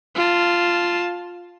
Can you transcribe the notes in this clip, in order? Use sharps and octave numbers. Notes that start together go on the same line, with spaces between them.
F4 A5